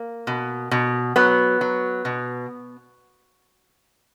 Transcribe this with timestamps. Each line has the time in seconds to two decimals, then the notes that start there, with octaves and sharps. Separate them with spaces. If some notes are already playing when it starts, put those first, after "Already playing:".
Already playing: A#3
0.27 B2
0.71 B2
1.16 F#3 B3
1.61 F#3
2.05 B2